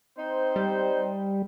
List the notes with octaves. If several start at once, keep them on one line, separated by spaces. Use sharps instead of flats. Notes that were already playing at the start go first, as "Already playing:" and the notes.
C4 D#4 C5
G3